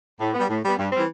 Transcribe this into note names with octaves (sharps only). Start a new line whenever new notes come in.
A2
G3 B3
A2
G3 B3
G2
E3 G3 C4